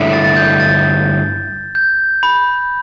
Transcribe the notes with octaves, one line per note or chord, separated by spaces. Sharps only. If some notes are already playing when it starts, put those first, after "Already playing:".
Already playing: G2 D3 A3 E4
A6
A6
G6
A6
G6
B5